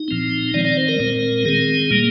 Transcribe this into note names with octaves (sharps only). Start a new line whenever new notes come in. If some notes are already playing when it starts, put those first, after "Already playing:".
Already playing: D#4
A#2 F3 C4
D#3 G#3 C4 D5
D5
C5
A#4
A#2 G#3 C4
D#3 G#3 C4 G#4
A#2 G3 A#3